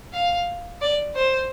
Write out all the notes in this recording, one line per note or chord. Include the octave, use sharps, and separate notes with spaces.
F5
D5
C5